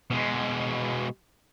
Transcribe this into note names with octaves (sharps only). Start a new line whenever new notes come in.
B2 G#3